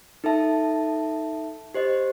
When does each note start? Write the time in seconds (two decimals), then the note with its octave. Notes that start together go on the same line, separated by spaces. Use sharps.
0.24 D#4 A4 E5 A5
1.74 G4 C5 D#5